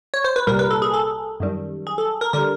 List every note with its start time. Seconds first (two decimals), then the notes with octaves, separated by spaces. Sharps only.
0.14 C#5
0.24 C5
0.36 B4
0.47 C2 A#2 G3 A#4
0.59 B4
0.71 A4
0.82 G#4
0.94 A4
1.40 F#2 D#3 G3
1.87 G#4
1.98 A4
2.21 A#4
2.33 D3 G3 A#4